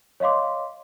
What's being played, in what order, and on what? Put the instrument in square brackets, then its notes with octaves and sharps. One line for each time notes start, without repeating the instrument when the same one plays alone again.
[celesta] C#5 D#5 F5 C6 D6